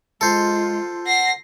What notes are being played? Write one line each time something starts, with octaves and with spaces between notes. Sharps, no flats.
G#3 F4 A4 C5
F#5 A#6 C7